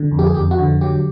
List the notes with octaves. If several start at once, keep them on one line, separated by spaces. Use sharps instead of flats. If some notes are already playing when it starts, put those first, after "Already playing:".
Already playing: D3
F2
G4
G#4
F2 G4
F#4
D3
F#3 G4